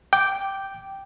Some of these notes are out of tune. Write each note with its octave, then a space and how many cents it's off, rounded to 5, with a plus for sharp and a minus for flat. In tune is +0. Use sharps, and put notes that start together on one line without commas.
G5 -5 D6 +0